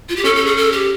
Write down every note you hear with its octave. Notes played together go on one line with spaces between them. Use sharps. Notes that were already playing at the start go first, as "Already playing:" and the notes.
F4
G4
C#4 A4
A4
G#4
A4
G4